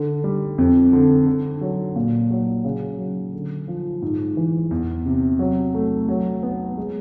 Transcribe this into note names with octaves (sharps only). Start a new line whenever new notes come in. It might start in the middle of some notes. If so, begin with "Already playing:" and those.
Already playing: D3
G3
F2
D3
D3
F#3
A#2
F#3
C#3
F#3
D3
F3
G#2
E3
E2
C3
F#3
A3
F#3
B3
G#3